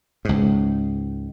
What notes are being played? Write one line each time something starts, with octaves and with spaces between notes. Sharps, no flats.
C#2 G#2